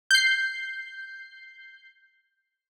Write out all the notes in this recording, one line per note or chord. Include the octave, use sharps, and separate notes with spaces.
G6 C7